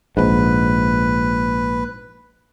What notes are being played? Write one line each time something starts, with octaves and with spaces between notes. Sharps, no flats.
A#1 G#2 B4